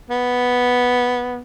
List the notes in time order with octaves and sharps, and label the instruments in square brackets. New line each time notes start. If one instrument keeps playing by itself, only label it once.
[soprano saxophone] B3